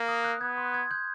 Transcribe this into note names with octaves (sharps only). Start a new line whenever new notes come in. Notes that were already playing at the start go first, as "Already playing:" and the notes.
Already playing: A#3
D#6
F#6
B3 G#6
C6
G#6
G6